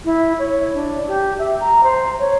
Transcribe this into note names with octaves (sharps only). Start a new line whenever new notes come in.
E4
C#5
D4
G4
E5
A#5
C5
C#5